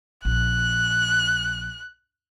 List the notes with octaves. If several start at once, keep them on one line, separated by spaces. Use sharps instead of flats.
A#1 F#6